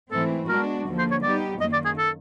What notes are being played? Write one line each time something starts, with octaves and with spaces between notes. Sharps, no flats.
G#2 E3 A3 C4 A4
G#3 B3 D4 F#4 A#4
D#2 D3 F3 A#3
C5
C#5
G3 B3 D#4 G4 D5
F#2 D#3 F#3 A#3 D#5
D5
G#4
A4